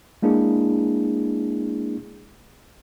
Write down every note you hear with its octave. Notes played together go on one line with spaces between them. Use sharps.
G#3 A#3 D4 E4 G#4